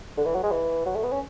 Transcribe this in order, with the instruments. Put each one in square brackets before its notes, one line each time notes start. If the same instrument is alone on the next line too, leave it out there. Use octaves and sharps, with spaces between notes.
[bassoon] D3
E3
F#3
G#3
E3
F#3
A3
B3
C#4